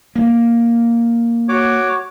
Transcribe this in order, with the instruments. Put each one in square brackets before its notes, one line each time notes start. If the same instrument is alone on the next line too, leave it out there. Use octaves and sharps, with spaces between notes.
[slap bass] A#3
[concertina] F#4 C#5 D6